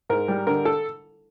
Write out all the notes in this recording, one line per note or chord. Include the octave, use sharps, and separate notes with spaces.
G#2 A#4
G3
D3 A#4
A4